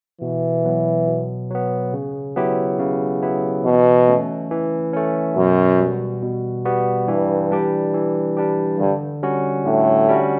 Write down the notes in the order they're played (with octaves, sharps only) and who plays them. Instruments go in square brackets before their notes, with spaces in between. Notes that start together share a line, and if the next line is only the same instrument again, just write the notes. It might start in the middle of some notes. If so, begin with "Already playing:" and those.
[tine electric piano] B2 [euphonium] E3
[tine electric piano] F#3 B3
B2
F#3 B3
C#3
F#3 B3 E4 G4
C#3
F#3 B3 E4 G4
[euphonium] B2 [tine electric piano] E3
[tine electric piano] A3 C#4
E3
A3 C#4
[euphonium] F#2 [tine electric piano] B2
[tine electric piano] G3 B3 F#4
B2
G3 B3 F#4
[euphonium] G2 [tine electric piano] E3
[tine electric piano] G3 D4 G4
E3
G3 D4 G4
[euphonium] G2 [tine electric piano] D3
[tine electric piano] G3 C#4 F#4
[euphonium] A2 [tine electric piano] D3
[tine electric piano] G3 C#4 F#4